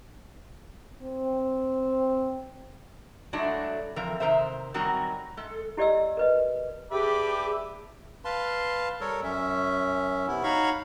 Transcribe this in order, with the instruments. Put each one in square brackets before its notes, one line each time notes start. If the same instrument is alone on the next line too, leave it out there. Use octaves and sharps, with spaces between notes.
[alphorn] C4
[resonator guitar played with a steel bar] F#3 G#3 A3 D4 E4 F#4
E3 F3 C4 A#4
C3 D#3 A#4 C5 E5
D#3 F#3 G3 C4 F#4 A#4
G#3 A4
[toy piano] E4 G4 D5 D#5 E6
A#4 B4 D#5
[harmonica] D4 B4 D5 [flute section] G4 D6 [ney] G#4 [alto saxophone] E5
[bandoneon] B4 F5 A5 C6
G3 A4 A#4 C#5
F#2 C#4 E5
C3 B3 E4
D#4 F#4 C#5 F5 B5 C#6